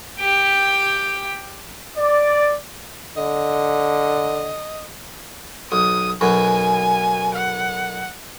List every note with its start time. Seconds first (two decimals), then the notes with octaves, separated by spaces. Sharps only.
0.19 G4 G5
1.97 D5
3.17 D3 D#5
5.72 B1 D#6
6.21 B1 F#2 B2 G#5
7.34 F#5